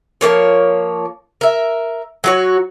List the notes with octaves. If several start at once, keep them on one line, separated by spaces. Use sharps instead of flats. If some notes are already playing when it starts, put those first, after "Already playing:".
F3 G3 A#3 C#5
A#4 E5
F#3 F#4 C#5